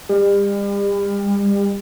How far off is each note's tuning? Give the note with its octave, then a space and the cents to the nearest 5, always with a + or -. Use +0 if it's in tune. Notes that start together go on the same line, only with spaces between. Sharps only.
G3 +40